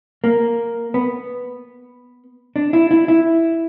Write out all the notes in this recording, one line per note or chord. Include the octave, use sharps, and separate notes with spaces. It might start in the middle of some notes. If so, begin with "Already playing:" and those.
A#3
B3
D4
E4
E4
E4